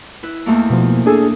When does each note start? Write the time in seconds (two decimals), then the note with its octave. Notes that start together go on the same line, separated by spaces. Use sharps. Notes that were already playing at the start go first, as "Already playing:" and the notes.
0.23 E4 B4
0.46 E2 A3 A#3
0.70 B2 F3
1.06 D4 G#4 A4